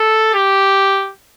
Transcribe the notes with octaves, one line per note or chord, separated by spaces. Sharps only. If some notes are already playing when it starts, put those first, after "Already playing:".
Already playing: A4
G4